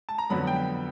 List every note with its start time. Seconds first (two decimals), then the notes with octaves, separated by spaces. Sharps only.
0.09 A5
0.18 A#5
0.30 F2 D3 F#3 B3 B5
0.47 G5